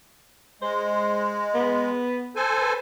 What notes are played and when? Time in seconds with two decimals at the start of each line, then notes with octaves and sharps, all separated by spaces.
0.62 G#3 C5
1.54 B3
2.36 A4 C5 G#5
2.61 B4